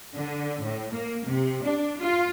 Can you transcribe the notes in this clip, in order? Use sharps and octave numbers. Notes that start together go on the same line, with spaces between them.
D3
A2
A#3
C3
D4
F4